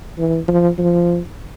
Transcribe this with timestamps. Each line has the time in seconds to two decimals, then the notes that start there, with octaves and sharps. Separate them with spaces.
0.18 E3
0.48 F3
0.78 F3